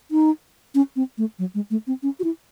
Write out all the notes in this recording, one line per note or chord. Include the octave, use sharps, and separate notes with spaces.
D#4
C#4
C4
A3
F#3
G#3
A3
C4
C#4
F#4
E4